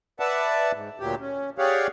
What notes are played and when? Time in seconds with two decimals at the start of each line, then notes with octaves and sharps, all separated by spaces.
0.20 B4 D5 E5 F#5 A5
0.73 G#2
1.00 D2 A#2 F#3 G4
1.20 C#4
1.58 G4 G#4 C#5 D5 F5 F#5